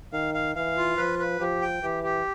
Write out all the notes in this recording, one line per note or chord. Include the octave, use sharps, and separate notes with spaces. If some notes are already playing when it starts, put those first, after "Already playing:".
D#3 F5
F5
E3 F5
F4
F3 B4
B4
F3 G4
G5
E3 G4
G4